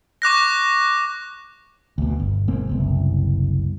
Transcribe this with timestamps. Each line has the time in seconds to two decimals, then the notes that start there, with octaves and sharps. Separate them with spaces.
0.22 C#6 D6 F#6 A#6
1.98 D2 B2
2.20 G1
2.48 B2 G#3 A#3 C4
2.69 F#1 C2 B3